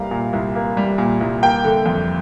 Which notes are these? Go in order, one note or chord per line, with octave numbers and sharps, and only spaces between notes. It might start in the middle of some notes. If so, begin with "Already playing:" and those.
Already playing: C2 G3 A#3 F5 A#5
A#2
C2
A#3
G3
A#2
C2
A#3 G5
D3
F2